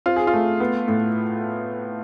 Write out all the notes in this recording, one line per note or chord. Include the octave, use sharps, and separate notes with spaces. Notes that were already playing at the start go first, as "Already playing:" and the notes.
C4 F4
G#4
F4
A3
B3
A2